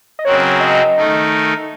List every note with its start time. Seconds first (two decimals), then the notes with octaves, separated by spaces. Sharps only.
0.19 D#5
0.25 C#3 F#3 C4 F#4 A#4 C#5
0.60 D#5
0.97 D#3 A3 D#4 A#4